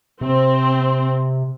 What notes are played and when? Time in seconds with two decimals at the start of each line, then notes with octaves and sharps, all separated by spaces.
0.21 C3 C4